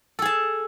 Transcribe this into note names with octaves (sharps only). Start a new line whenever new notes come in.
G#4 A4 A5